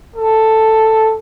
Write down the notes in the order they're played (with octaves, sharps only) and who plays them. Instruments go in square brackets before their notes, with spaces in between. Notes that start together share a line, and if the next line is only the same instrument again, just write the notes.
[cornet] A4